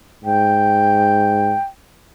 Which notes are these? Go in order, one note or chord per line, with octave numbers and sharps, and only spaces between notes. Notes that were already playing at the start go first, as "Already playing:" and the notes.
G#2 G5